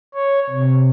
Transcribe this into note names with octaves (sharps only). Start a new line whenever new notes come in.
C#5
C3